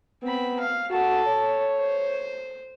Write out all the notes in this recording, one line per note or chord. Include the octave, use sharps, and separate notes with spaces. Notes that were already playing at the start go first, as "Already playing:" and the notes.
B3 C4 B5
F5
F#4 A4 A5
C#5
C5